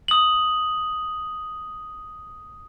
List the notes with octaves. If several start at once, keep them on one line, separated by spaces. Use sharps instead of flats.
D#6 F#7